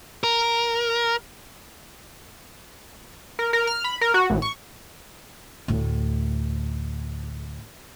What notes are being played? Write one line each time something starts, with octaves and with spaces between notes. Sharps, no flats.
A#4
A#4
A#4
F6
B5
A#4
F#4
A1
C#6
D2 A2